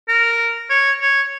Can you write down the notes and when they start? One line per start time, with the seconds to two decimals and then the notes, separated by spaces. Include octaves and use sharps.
0.09 A#4
0.70 C#5
1.01 C#5